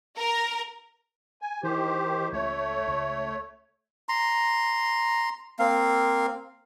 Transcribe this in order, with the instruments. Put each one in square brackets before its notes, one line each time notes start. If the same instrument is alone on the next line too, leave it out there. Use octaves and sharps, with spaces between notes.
[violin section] A#4
[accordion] G#5
[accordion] D#3 G4 C5 [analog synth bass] E3
[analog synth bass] C#2 [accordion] A3 C#5
[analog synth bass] C#2
[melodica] A#5 C6
A#3 C4 F5